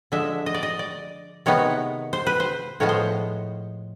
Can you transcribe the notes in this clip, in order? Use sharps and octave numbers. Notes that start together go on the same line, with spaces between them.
D3 F3 G#3 E5
D#5
D5
D#5
D5
C3 D#3 G#3 B3 C#5
C5
B4
C5
A2 F3 G#3 B3 C#5
C5